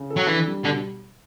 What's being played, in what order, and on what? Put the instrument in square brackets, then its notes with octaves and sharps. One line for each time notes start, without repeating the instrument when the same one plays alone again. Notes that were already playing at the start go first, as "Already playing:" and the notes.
Already playing: [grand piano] C#3
A4
[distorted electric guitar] F#3
[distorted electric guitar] E3 [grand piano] D4
[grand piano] G3
[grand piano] B2 [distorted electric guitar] D3